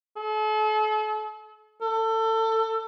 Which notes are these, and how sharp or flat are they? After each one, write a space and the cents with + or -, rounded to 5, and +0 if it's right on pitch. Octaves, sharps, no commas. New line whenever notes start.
A4 -40
A4 +25